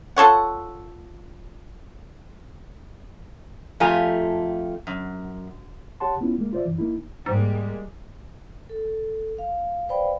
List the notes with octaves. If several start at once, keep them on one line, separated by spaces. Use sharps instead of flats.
F4 A4 C#5 F#5
F2 A3 F4 G4 G#5 A#5
F#2
G4 C#5 F#5 A5 C6
B3 C#4 E4 F4
G#3 A#3
F4 C5 D5 E5
F#2 E3
A#3 D#4 E4
G#2 G3 G#3 A#3
A4
F5
B4 C5 D5 F5 G5 B5